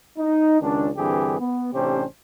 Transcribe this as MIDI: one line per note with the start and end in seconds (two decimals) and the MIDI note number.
0.18 0.59 63
0.61 0.90 37
0.61 0.90 51
0.61 0.90 61
0.61 0.90 62
0.97 1.36 43
0.97 1.36 50
0.97 1.36 52
0.97 1.36 60
0.97 1.36 67
0.97 1.36 68
1.40 1.71 59
1.73 2.04 33
1.73 2.04 48
1.73 2.04 61
1.73 2.04 62
1.73 2.04 67
1.73 2.04 72